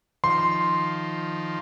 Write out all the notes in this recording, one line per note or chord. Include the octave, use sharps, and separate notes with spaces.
D#3 F3 C6